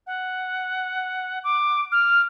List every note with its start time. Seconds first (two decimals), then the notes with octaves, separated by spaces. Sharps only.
0.07 F#5
1.44 D6
1.92 F6